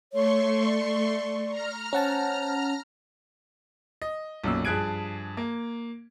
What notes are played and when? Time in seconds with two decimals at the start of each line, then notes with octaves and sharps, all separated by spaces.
0.13 A3 C#5 C6 C#6
0.65 D5
1.50 A#5 F6
1.93 C#4 C5 F#5 A5
4.02 D#5
4.44 B1 F#2 A#2 E6
4.65 G2 F3 G#4 F#6 G#6 D7
5.37 A#3